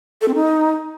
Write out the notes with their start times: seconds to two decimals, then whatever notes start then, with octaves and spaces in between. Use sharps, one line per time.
0.21 A4
0.28 C4
0.35 D#4